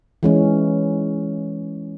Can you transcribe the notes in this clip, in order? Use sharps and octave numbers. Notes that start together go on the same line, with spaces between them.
E3 G#3 C#4